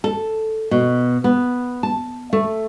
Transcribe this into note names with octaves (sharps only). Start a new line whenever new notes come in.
A4
B2
B3
A5
A3